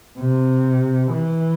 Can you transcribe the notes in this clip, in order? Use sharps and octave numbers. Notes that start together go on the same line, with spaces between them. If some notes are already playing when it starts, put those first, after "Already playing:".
C3
E3